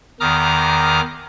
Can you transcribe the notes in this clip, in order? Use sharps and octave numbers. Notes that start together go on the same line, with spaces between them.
E2 D#3 A#5 D6 D#6 F6